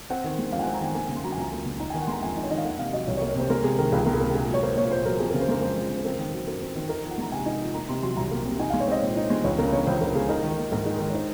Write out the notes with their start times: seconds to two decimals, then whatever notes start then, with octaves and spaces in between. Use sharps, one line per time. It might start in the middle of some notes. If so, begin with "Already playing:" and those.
0.10 C4 F#5
0.24 D#3
0.38 G#3
0.52 F2 F5
0.59 G#5
0.63 F#5
0.66 C4
0.74 A#5
0.81 D#3 G#5
0.95 A#3 G#5
1.09 C#3
1.16 C6
1.23 F#3 A#5
1.32 G#5
1.37 C#2 A#5
1.52 A#3
1.66 C#3
1.80 D#4 A#5
1.90 G#5
1.94 D#3
2.01 F#5
2.07 G#3 A#5 C6
2.22 F2 G#5
2.37 D#4
2.43 C#5
2.50 D#3 D#5
2.58 F5
2.65 A#3 F#5
2.79 C3 F5
2.93 F#3 D#5
3.07 C2 C#5
3.17 C#5
3.22 A#3
3.28 C#5
3.36 C3 C5
3.50 G#3 A#4
3.64 C3 G#4
3.78 D#3 A#4
3.92 C#2 G#4
4.06 G#3 A#4
4.14 G#4
4.21 C3 A#4
4.34 A#2 G#4
4.48 F#3
4.54 C#5
4.63 A#3 C5
4.77 A#2 C#5
4.91 A#2 C5
5.05 F#3 A#4
5.19 F2 G#4
5.30 A#4
5.34 C#3
5.41 C5
5.48 G#3 A#4
5.61 F2 C5
5.76 F2
5.90 C#3
5.97 C5
6.04 C4 A#4
6.18 D#3
6.33 F#3
6.47 F#2 A#4
6.61 C4
6.75 D#3
6.89 D#4 A#4
7.03 F3
7.10 F#5
7.18 G#3 A#5
7.32 C3 G#5
7.46 D#4
7.60 F3
7.74 A#3 A#5
7.88 C3 C6
8.03 F#3 C6
8.16 C2 A#5
8.31 A#3
8.45 C3
8.59 D#4 G#5
8.70 F5
8.74 G#3
8.80 C#5
8.88 C4 D#5
9.02 A#2 C#5
9.17 D#4
9.30 G#3
9.44 C#2 C#5
9.58 C#3 A#4
9.72 G#3 C#5
9.87 C#2 C5
10.01 C#2 A#4
10.15 C#3 G#4
10.29 D#4 A#4
10.43 D#3
10.58 A#3
10.72 G#2 A#4
10.85 D#4 G#4
10.98 D#3 A#4
11.09 C#5
11.14 D#4 C5